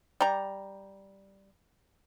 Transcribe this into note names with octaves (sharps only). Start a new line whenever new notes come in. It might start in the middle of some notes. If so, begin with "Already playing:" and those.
G3 A#5